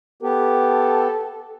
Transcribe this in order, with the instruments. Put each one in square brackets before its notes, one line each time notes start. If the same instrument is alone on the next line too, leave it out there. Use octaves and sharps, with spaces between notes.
[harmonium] B3 G4 [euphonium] A4